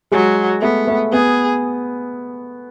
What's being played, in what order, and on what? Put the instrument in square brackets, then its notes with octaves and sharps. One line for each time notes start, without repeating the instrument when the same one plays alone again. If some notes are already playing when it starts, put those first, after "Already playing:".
[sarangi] F#3 [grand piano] G#3
[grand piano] A3 [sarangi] B3
[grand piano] A3
[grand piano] B3 [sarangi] G#4